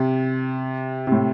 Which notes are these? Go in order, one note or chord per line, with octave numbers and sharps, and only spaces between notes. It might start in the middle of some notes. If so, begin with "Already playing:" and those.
Already playing: C3
C3
A2